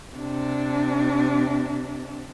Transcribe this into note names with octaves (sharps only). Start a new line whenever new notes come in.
C3 D4